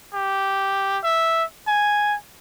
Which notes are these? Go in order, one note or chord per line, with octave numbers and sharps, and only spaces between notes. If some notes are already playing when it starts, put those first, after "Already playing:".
G4
E5
G#5